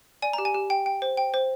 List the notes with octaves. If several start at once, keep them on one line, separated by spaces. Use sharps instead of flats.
D5 G#5
G4 A#5
G#5
G4
G5
G5
C5
G5
C5